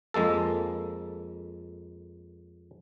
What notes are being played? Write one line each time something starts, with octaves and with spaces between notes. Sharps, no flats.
F2 G#3 A#3 A4